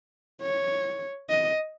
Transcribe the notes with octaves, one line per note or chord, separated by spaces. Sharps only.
C#5
D#5